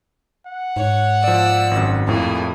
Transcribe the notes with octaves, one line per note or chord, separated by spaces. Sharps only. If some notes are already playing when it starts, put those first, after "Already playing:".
F#5
G#2 C#5
F3 D5 E6
G#1 F#2
F2 A2 A#3 G#4